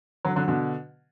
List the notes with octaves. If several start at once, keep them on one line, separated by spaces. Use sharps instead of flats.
D3 F#3
D3 F#3
B2 D3